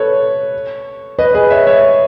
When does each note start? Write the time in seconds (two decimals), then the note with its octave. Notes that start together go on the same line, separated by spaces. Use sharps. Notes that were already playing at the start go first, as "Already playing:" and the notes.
Already playing: A4 B4 C#5
1.19 B4 D#5
1.35 G#4 B4
1.51 C#5 E5
1.66 C#5 E5